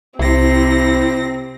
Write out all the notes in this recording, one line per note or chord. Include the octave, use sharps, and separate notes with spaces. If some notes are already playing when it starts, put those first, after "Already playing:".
C2 C3 C4 E4 A#6